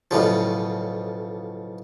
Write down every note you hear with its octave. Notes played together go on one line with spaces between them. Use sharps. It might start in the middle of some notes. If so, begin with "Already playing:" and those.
B1 A2 C#3 F3